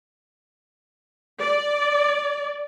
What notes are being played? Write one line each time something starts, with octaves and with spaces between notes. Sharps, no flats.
D5